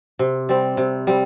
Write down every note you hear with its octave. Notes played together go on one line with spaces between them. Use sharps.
C3
G3 C4
C3
G3 C4